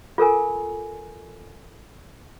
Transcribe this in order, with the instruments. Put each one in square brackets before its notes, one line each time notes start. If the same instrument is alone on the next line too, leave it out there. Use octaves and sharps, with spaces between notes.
[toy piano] F4 A4 A#4 G#5